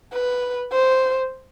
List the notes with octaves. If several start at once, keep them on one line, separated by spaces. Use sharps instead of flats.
B4
C5